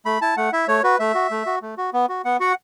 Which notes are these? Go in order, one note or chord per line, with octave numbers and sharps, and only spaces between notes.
A3 B5
E4 A5
A3 F#5
E4 E5
A3 C#5
F#4 B4
A3 E5
F#4
A3
F#4
A3
F#4
B3
F#4
B3 F#5
F#4 F#5